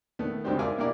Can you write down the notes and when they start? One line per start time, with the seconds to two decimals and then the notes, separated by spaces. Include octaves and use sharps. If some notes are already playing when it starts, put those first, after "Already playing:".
0.19 D#3 A3 B3
0.44 C#2 G#2 C4 F#4 G4 C5
0.59 A#4 D5 E5 F5 G#5
0.78 B2 A#3 E4 G4 A#4 D5